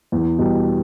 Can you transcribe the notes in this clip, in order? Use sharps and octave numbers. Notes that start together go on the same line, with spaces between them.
E2
B2 G3